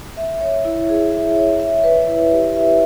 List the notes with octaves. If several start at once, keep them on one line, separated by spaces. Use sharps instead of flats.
E5
C#5
E4
G#4
E5
C#5
E5
B4
E4
G4
E5